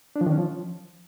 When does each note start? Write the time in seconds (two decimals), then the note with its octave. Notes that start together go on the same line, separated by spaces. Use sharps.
0.16 D4
0.21 F3
0.26 D#3
0.32 C#4
0.37 F3